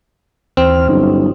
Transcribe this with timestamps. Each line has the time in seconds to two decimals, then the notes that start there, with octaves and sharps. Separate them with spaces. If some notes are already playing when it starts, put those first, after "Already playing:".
0.57 D#2 E3 C4 F6
0.88 G1 F#3 C#4 D#4